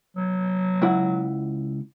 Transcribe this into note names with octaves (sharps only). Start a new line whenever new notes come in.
F#3
C#2 E4 F#5